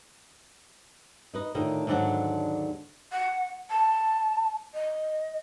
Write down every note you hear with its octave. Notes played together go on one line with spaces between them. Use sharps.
D#4 B4 D#5
A2 D3 D#3 F4 A4
D#2 G#2 D3 F#3 D4 F#5
F#5
A5
D#5